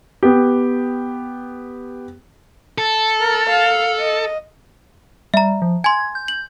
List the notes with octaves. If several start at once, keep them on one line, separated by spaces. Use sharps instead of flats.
B3 G4
A4
A#4
F5
D#5
G3 E5 A#5
F3
G#5 C6 G#6
G6
F#7